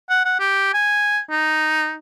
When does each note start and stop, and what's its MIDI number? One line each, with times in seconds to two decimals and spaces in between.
0.10 0.22 78
0.25 0.37 78
0.39 0.73 67
0.74 1.20 80
1.30 1.95 63